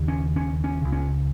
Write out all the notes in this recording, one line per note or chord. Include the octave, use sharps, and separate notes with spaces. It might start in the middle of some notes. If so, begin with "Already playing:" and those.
Already playing: D#2 C#3
C#4
C#4
C#4
C#2 C#3
C#4